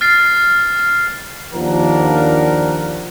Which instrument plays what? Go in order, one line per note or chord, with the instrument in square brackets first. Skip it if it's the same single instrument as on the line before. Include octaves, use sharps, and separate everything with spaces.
[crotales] F6 A6 C7
[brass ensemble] D#2 F3 D4 A#4 F#5